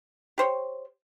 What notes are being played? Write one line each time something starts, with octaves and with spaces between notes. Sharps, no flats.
G4 C5 C#5